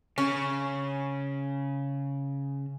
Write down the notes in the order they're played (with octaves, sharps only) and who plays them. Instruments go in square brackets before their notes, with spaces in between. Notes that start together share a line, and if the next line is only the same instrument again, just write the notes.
[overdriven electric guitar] C#3 [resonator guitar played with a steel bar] C#4